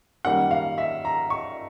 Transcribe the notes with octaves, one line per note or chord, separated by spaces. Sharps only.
F#2 D#3 G3 A#3 F#5
F5
E5
A#5
C#6